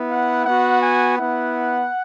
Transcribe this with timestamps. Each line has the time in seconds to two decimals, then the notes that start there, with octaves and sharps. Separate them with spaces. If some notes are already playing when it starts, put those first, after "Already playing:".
Already playing: B3 E4
0.10 F#5
0.45 B3 F#4 F#5
0.81 G#5
1.17 B3 E4 F#5